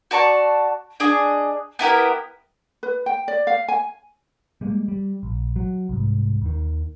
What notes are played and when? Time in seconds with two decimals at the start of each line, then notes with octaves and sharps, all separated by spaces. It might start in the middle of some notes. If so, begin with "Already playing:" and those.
0.11 F#4 D5 A5 C#6
1.00 D4 G#4 D#5
1.79 B3 E4 G4 A#4
2.83 B4
3.06 G5
3.28 D5
3.47 F5
3.68 G#5
4.61 G3 G#3 A#3
4.88 G3
5.23 A#1
5.56 F#3
5.89 C2 G#2
6.41 D#2 D#3